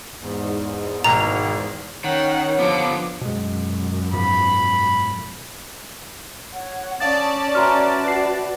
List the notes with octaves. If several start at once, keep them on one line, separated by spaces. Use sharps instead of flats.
E2 G#2
G#1 D#2 B2 A#5
D#3 C#4 C#5 F#5
D3 F3 B3 D6
F#2 B2 G#3
G#2 B2 F3 B5
C#5 F#5
C#4 D5 F5 A5 D#6 A6
F#4 B4 E5 A#5 C6 F6
C7